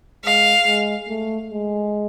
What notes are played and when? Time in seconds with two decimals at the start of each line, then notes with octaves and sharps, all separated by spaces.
0.25 G#3 F5
0.66 G#3
1.09 A3
1.50 G#3